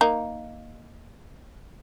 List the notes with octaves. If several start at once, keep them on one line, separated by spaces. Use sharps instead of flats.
A#3 D#4